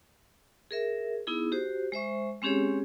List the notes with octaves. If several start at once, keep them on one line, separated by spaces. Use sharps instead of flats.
G#4 A#4 E5
B3 D#4 E4 G#4
F#4 G4 C5
G#3 C5 E5 C#6
G#3 C4 C#4 G4 G#4 C#5